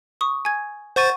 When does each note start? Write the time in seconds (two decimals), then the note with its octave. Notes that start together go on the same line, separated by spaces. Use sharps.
0.21 C#6 D#6
0.45 G#5 G#6
0.96 C5 F#5 C#6 A6 D#7